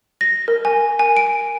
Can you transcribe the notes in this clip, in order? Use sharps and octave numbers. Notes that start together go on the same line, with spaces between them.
A#6
A#4
G#5
G#5
D7